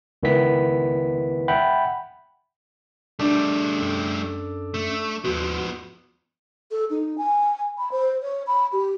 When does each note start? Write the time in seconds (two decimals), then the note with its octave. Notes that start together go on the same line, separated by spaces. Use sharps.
0.23 C#2 D#3 B3 E4 B4 B6
1.48 E5 F#5 G5 B5
3.19 G3 A3 D4
3.80 F#2 A4
4.74 A3
5.25 D#2 F3 B3 F#4 C6
6.71 A4
6.90 D#4
7.18 G#5
7.78 B5
7.91 C5
8.22 C#5
8.47 B5
8.72 G4